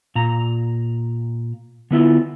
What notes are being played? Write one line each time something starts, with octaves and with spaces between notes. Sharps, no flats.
A#2 A#5
D3 B3 E4 F4